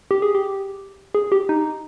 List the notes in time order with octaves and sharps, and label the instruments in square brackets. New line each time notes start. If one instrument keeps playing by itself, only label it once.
[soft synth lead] G4
G#4
G4
G#4
G4
D#4